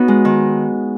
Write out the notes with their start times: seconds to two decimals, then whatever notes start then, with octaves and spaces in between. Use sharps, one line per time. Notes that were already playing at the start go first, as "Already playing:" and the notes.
Already playing: B3 C#4 D#4 F#4
0.08 G#3
0.25 D#3